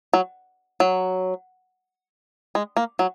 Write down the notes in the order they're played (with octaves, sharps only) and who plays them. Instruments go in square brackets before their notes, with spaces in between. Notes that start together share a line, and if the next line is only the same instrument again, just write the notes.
[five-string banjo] F#3
F#3
G#3
A#3
F#3